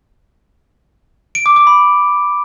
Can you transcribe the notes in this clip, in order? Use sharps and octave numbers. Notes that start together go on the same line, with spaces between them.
D7
D6
D6
B5